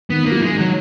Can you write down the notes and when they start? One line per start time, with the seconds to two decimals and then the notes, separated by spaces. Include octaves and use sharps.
0.10 D#3 B3
0.26 A#3
0.31 F#3
0.42 G#3
0.53 D#3
0.58 F#3